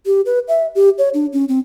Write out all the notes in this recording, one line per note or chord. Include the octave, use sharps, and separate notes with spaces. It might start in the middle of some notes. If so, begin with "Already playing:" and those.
G4
B4
E5
G4
C#5
D4
C#4
C4